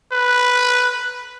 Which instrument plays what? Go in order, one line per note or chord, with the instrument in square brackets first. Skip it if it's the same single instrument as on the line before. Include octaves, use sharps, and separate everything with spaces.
[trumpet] B4